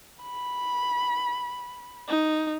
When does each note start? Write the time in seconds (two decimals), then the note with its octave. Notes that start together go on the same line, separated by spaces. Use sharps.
0.23 B5
2.08 D#4